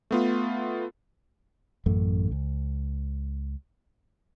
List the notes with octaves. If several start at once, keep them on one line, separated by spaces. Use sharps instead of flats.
A3 B3 F4
A1 F#2 A3
C#2